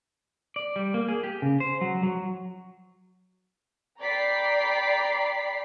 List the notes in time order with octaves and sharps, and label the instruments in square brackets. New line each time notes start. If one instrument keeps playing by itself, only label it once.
[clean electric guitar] D5
G3
A#3
G#4
G4
C#3
C5
F#3
F#3
[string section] D5 G5 A#5 B5 B6 C7